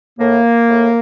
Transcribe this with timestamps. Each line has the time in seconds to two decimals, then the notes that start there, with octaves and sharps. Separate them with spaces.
0.19 A2 A#3
0.69 A2